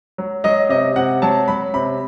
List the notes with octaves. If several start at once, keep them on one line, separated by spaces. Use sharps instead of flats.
F#3
F#3 D#5
C3 D#5
C3 F#5
F#3 A5
F#3 B5
C3 B5